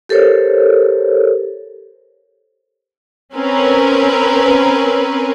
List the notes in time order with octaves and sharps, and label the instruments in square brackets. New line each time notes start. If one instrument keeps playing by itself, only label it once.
[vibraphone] G4 A4 A#4 C5 C#5
[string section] C4 C#4 A#4 B4